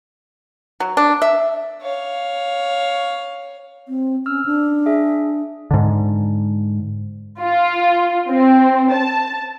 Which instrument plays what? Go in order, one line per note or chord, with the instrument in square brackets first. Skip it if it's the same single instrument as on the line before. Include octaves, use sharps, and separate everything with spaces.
[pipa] F#3
D4
E5
[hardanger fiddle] C#5 F5
[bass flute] C4
[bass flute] C#4 [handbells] E6 F6
[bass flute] D4
[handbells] G#4 E5
[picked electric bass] G#2 D3
[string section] F4
C4
A5